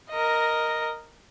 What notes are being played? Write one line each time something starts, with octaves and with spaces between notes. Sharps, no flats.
A#4 D#5